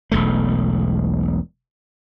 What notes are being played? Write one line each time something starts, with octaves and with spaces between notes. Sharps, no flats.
E1 B1 A3